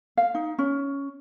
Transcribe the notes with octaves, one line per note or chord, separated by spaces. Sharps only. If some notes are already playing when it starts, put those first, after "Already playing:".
F5
D#4
C#4